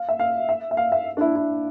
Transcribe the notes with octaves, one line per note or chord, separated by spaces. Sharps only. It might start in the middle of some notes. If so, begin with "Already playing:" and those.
Already playing: F5
E5
F5
E5
E5
F5
E5
D4
E4
E4